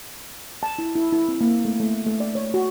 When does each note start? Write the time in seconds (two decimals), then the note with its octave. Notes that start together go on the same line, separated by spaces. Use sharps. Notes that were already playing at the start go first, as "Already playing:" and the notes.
0.63 A5
0.78 E4
0.95 E4
1.12 E4
1.28 C4
1.41 A#3
1.65 A3
1.80 A3
2.06 A3
2.20 D5
2.35 C#5
2.54 F#4